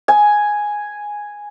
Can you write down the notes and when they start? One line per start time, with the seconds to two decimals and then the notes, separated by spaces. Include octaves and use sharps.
0.08 G#5